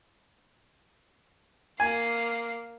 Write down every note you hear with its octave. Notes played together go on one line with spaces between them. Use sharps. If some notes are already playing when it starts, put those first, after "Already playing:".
A#3 G#5 C7